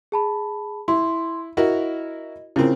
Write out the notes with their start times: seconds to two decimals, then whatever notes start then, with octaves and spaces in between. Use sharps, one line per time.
0.12 G#4 A5 B5
0.88 E4 C6
1.57 E4 F#4 A#4 D#5
2.56 C#3 C4 E4 F4 A#4